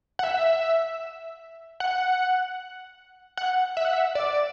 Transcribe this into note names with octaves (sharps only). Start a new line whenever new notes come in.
F#5
E5
F#5
F#5
E5
F#5
E5
D5